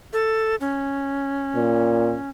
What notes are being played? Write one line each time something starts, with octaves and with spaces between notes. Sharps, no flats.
A4
C#4
A#2